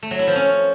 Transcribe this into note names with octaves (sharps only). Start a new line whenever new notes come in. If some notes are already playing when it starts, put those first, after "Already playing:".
A3
F#3
E4
F3
C#4